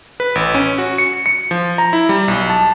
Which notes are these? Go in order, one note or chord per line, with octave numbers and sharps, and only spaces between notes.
B4
A1
C#4
F#4
C#7
C#7
F3
A#5
E4
G3
B1
A5